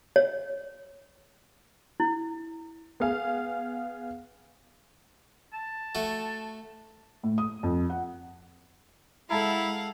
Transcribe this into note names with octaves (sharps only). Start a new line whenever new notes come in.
C#5
E4
B3 G#4 F5
A5
A3 F#4
A2
D#6
F2
F#5
G#3 E4 A4 F5 F#5 A5 A#5